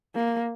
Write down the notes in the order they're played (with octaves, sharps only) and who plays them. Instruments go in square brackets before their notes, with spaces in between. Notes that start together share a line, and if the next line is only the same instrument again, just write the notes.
[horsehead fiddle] A#3